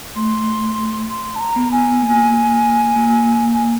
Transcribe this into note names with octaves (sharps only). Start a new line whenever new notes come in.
A3 C6
C6
A5
A#5
B3
G#5
A#3
A#3